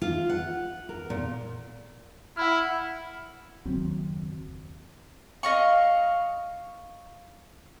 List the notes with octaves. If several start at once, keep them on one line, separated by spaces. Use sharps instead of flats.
F4
F#5
A#4
A#2
E4 F#5 B5 F6
F#1 D#2 F#3 C4
D#5 F5 C#6